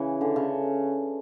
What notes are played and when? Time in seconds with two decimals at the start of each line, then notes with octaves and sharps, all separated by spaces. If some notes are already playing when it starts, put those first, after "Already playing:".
Already playing: C#3 E3
0.21 D3
0.36 C#3